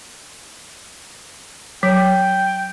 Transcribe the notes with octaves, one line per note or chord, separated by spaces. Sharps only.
F#3 G5